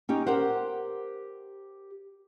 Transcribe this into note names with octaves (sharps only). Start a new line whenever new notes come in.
C#4 D#4 G4
G4 A#4 C5 F#5